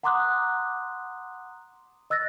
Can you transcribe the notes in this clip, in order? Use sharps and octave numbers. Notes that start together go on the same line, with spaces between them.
F#5 A#5 C6 D6 D#6 F#6
D#5 E6 F#6 A6 A#6